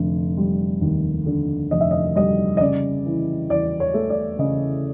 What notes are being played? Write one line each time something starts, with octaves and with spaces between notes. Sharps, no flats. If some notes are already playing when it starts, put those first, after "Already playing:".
Already playing: F1 D3
G3
D#2
D3
F1 D#5
E5
D#5
G3 D#5
D#5
C#3 D5
E3
E2 D5
C#5
A3
D5
C#3 D#5